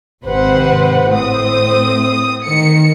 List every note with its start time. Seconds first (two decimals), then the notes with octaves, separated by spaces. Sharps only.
0.24 G#1 C3 B4 C5 F#5
1.10 A2 C4 D#6
2.44 D#3 C#7